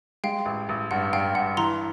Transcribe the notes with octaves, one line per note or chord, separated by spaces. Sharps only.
G#3 F5 G5
A1
A1
G2 F#5
G2 F5 G5
G2 F#5
E3 A#5 C6